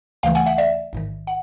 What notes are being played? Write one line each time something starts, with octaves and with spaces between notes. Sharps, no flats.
D2 C#3 E3 A3 F5 G5
F#5 G#5
E5 F#5
D5 E5
A1 G#2 D#3
F#5